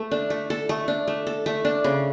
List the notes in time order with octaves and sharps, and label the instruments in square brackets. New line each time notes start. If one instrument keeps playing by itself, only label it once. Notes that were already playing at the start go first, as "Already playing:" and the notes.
Already playing: [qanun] A3 A4
D4
A3
A4
A3
D4
A3
A4
A3
D4
C#3